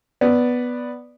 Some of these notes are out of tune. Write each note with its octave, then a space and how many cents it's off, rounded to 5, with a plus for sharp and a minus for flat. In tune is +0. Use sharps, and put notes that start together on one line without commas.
B3 +0 D5 +0